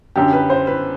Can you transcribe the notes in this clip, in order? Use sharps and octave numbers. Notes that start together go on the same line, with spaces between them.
F#2 D3 G4
B4
C5
B4